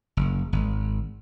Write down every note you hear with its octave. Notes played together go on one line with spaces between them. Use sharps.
F#1
G#1